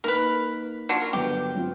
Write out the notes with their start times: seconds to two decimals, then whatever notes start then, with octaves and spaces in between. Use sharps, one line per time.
0.04 A#3 D#4 A#4 B4
0.89 F#3 D4 F4
1.02 A#4
1.13 G1 F#3 G4 B4
1.55 F#3 C4 F4